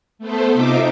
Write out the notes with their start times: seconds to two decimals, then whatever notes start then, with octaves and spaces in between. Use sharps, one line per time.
0.19 A3 B3 A4 C5
0.52 C3 D#4 F4 E5 D6